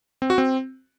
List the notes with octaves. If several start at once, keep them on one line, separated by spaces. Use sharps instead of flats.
C4
F#4
C4